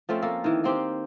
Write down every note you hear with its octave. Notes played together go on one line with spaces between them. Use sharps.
F3 A3 C4 C#4
A#3 A4
D#3 E3
A#3 C4 G4